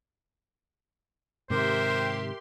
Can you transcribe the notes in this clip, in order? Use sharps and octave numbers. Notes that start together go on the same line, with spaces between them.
G#2 C3 D#3 G4 A#4 C5 E5 C6